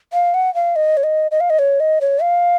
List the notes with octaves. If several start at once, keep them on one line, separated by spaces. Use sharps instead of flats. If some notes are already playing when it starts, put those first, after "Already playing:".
F5
F#5
F5
D#5
C#5
D#5
D#5
F5
D#5
C#5
D#5
C#5
F5